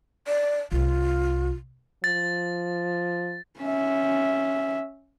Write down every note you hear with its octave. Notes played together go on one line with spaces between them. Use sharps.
D5
C2 F4
F3 A6
C#4 E5